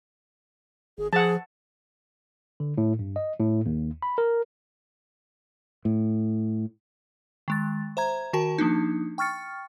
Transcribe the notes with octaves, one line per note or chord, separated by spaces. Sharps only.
G#1 G#4
F3 G#4 F#5 A5
D3
A2
G2
D#5
A2
D#2
B5
A#4
A2
D#3 G#3 A6
C5 E5 A#5 G#6
D#3 F#4 A#4 A5 E7
F3 A#3 D4 D#4
G5 C#6 F6 A6 C#7